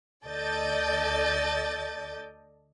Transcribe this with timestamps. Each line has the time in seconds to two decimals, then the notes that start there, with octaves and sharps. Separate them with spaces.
0.26 D2 A4 D5 D#5 G6 A6